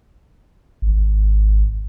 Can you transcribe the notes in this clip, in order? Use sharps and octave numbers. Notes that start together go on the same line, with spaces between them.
G#1